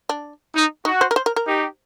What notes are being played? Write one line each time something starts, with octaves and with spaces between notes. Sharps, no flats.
D4
D#4
D#4 F#4
C5
A#4
C5
A#4
A#4
D#4 G4